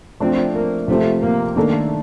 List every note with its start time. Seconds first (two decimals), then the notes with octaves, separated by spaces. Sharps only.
0.20 F3 A3 C4 D4
0.54 A#3
0.88 C3 F3 A3 C4 G4
1.22 A#3
1.56 D#3 A3 A#3 D4 A4